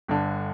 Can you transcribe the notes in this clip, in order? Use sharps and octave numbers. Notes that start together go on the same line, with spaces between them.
G1 G2 D3